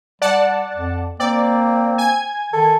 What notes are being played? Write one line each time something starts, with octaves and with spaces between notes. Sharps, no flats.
G3 D5 F#5 A5
F2
A#3 C4 D5
G#5 G#6
D#3 A4